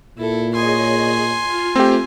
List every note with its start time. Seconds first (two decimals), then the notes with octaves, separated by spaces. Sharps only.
0.18 A#2 E4 A4
0.54 G#4 C#5 D#5 G#5 C6
1.43 F4
1.76 A3 C4 G4